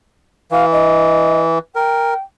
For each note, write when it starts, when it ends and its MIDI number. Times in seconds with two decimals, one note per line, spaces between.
0.52 1.59 52
0.52 0.65 77
0.72 1.40 75
1.76 2.14 70
1.76 2.18 79